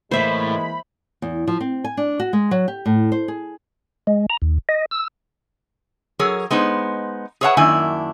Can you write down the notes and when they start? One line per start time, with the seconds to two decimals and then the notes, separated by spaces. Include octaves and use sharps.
0.11 A2 E3 G#3 A#3 C5 E5 B5
1.22 E2
1.48 F3
1.61 C4
1.84 G#5
1.97 D4
2.20 F#4
2.33 G#3
2.51 F#3
2.68 G4
2.86 A2
3.12 C5
3.28 G#4
4.07 G#3
4.30 A#5
4.42 D#2
4.69 D#5
4.91 E6
6.19 F#3 G#4 A#4 C#5
6.50 G#3 B3 D#4 C5
7.41 G#4 B4 C#5 D5 F#5 A5
7.57 F#2 D#3 A#3 D4 E4 G#5